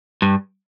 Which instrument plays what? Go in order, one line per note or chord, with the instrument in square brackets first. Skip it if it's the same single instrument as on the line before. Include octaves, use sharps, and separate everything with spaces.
[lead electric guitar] G2